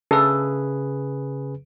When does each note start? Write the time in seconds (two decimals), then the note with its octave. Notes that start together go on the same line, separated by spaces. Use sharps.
0.11 C#3 G#4 A4 B4